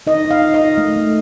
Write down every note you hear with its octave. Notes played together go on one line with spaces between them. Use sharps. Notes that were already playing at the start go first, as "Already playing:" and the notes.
D#4 D#5
D#4
F5
D#4
D#5
D#4
A3
A3